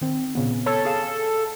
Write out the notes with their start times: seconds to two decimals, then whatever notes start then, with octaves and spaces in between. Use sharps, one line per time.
0.01 D#3 C4
0.35 A#2 C#3 B3
0.66 A4 C#5
0.85 G#4 F5 E7